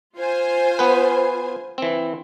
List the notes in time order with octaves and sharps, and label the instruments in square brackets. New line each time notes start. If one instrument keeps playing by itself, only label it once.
[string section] F4 C5 G#5
[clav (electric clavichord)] B3 B4
E3 C4